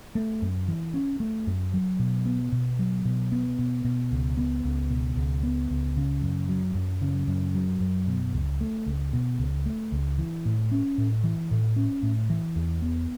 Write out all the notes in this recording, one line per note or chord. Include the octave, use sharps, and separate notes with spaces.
A3
F#2
E3
C#4
A3
F#2
F#3
B2
B3
B2
F#3
B2
B3
B2
B2
C#2
B3
C#2
B2
C#2
B3
C#2
C#3
F#2
F#3
F#2
C#3
F#2
F#3
F#2
B2
C#2
A3
C#2
B2
C#2
A3
C#2
E3
A2
C#4
A2
E3
A2
C#4
A2
E3
E2
B3